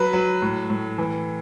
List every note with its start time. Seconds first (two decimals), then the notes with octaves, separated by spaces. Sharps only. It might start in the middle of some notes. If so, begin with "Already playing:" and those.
Already playing: F#3 B4
0.13 F#3
0.42 A2
0.70 A2
0.98 E3